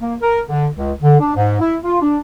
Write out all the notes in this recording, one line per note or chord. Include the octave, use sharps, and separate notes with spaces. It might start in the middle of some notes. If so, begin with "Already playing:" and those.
A#3
A#4
D3
C#2
D3
D4
G#2
E4
F4
D4